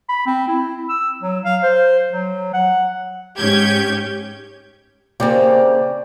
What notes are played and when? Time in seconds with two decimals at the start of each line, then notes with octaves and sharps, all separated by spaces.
0.09 B5
0.27 C4
0.48 E4
0.89 E6
1.22 F#3
1.45 F5
1.63 C5
2.13 F#3
2.54 F#5
3.37 G#2 C#4 G4 G6 G#6
5.20 C#3 A#3 C4 G4 D5